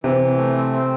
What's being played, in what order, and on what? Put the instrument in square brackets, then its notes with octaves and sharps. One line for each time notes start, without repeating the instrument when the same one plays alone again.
[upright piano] C3 [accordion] E3
[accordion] E3
A3
C4
C4